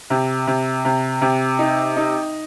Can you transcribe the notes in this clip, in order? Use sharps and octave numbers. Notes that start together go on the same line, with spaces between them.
C3
C3
C3
C3
D#4
D#4